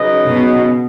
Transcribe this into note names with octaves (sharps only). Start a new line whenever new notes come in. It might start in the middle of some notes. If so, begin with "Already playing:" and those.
Already playing: C#3 F#3 D#4 B4 D#5
B2